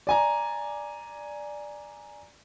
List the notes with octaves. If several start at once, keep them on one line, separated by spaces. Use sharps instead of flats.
D5 G#5 A#5